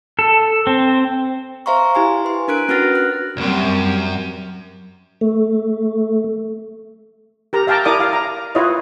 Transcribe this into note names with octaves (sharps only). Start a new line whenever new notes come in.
A4
C4
C5 E5 F5 A#5 C6 C#6
E4 G4 G#5 C6
B4 C6
D4 A#4 F#6 D7
C#4 F#4 B4 F6 A6 A#6
F#6
B1 F#2 G3 C4
A3
G4 A#4 A#5
E5 F5 G5 A5 A#5 D6
E4 A#4 D5 D6 D#6
F5
A#5
E4 F4 B4 C#5 D#5